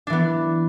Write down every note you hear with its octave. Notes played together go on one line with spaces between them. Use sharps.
E3 B3 D4